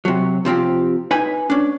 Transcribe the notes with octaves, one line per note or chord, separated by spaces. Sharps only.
C3 F#3
C3 F3 C4 G4
D#4 B4 G#5
C#4 D4